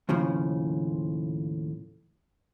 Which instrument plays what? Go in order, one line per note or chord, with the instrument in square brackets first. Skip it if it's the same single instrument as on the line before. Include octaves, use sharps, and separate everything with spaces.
[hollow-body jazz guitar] D#2 A2 C#3 F3